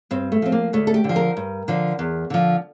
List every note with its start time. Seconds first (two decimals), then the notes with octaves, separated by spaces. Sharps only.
0.11 G2 C4
0.32 A3
0.42 F3 C4
0.52 A#3
0.73 D2 A3
0.87 A4
0.94 G4
1.04 D3
1.09 F3
1.16 A#4
1.37 G2
1.68 D3 F3
1.99 E2
2.30 D3 F3